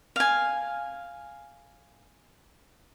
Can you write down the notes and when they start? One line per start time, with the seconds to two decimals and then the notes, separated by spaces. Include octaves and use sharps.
0.16 F5 G#5